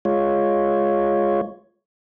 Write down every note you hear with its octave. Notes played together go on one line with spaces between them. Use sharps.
G#3 F4 C#5